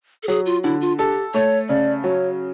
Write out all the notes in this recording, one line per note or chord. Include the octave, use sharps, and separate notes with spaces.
A4
F#3 G#4
F4
D3 E4
F4
G4 A4
A3 C#5
C#3 D5
F#3 C#5